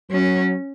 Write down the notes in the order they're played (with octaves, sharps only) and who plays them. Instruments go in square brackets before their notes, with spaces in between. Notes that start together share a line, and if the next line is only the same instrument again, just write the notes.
[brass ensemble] F#3 [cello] C#4